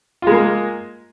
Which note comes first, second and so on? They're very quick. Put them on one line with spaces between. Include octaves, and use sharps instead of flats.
F4 G#3 A#3